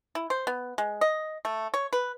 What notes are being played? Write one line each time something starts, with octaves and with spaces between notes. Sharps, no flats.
E4
C5
B3
G#3
D#5
A3
C#5
B4